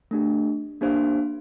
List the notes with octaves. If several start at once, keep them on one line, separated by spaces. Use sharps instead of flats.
A3 D4 G4
A#3 D4 G4 C5 F5